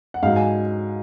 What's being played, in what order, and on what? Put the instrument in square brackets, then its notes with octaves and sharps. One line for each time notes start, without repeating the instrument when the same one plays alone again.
[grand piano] F#5
G#2 F#3 F5
G#5